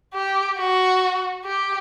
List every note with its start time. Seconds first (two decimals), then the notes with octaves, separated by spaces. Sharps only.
0.14 G4
0.58 F#4
1.45 G4